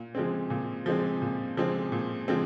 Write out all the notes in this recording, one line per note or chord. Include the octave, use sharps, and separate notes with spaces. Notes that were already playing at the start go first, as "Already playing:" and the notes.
Already playing: A#2
F3 G#3 C4
A#2
F3 G#3 C4
A#2
F3 G#3 C4
A#2
F3 G#3 C4